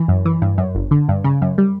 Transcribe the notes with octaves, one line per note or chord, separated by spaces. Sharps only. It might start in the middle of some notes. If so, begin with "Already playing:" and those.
Already playing: E3
F#2
E3
G2
F#2
G1
D3
G2
C#3
F#2
G3